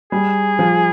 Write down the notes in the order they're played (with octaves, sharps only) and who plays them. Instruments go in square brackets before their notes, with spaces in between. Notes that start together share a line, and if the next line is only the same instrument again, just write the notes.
[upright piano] G3 [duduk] G#4
[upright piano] F3